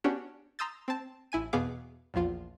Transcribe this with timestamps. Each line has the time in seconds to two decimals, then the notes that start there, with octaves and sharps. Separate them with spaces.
0.04 B3 C#4 D4 F#4 G4
0.59 A#5 C6 D#6 E6 G6 A6
0.88 C4 A5
1.32 A1 E4 G#5 D#7
1.53 E2 B2 B3 G#4 F5 D6
2.14 A#1 E2 F3 F4